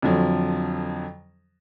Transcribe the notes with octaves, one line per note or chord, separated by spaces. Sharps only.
F2 D3 F3 F#3